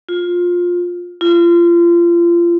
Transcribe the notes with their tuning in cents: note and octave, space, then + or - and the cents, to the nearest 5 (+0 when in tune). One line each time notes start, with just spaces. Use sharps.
F4 +15
F4 -30